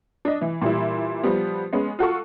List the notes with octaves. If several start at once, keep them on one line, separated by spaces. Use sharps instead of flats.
D4 D#5
E3
A#2 E3 G3 E4
F3 G3 B3
G#3 B3 C#4
F4 F#4 A4 C#6